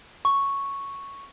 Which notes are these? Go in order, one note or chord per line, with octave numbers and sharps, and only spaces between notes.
C#6